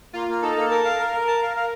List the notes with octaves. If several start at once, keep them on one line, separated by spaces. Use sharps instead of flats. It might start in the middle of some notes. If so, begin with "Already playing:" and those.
A#3 F4
A#3
D#4 A4
A#3
A#4 A5
F5
A#4
A#4
A5
F5
F5